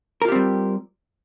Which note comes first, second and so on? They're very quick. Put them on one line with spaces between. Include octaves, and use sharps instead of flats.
A#4 F4 G4 C4 G3